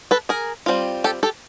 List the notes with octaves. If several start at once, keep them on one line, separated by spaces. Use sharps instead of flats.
A4 B4
G#4 A#4
G3 C4 F4
G4 A4
G4 A4